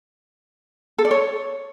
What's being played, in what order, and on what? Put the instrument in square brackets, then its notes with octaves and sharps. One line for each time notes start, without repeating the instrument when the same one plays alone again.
[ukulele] A4
D5
C#5